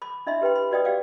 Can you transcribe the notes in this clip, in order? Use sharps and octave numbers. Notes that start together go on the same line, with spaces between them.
B5 D6
D4 E4 D#5 E5 B5 C6
G4 B4 G5 B5
B5
F#4 B4 D5 D#5 G5 D#6
G4 D5 F5 G5 D6